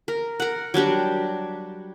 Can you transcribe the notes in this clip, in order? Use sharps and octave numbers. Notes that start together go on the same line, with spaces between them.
A#4
A#4 F#5
F#3 G3 D4 G4